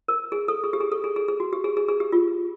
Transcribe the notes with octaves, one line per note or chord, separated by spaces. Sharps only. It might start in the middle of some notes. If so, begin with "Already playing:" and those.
A#4
G#4
A4
G#4
G4
G#4
A4
G#4
G#4
G#4
F#4
G4
G#4
G#4
G#4
G4
F4